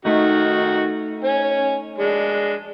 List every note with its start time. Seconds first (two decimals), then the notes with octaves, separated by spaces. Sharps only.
0.05 D#3 A3 D#4 F#4
1.24 C#4 G#5
1.98 G#3 D4